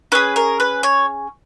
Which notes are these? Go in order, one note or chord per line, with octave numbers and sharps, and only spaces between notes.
C#4 G#4 B4
A#4
B4
C#5